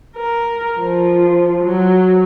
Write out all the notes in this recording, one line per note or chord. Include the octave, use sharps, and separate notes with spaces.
A#4
F3
F#3